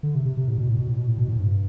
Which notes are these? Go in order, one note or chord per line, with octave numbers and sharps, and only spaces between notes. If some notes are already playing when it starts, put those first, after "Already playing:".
D3
C3
C3
C3
A2
B2
A2
B2
A2
B2
A2
B2
A2
G2